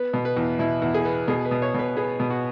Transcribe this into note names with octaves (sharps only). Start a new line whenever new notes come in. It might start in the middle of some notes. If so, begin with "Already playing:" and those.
Already playing: B3 B4
B2
B4
E2
B2 E4
E2
G#4
B3
B2 G#4
B4
B2
C#5
B2 B4
B3 G#4
B2
F#4